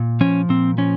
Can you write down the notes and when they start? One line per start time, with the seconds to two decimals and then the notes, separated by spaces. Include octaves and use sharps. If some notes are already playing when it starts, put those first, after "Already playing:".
Already playing: A#2
0.21 F3 C#4
0.49 A#2 C4
0.78 F3 C#4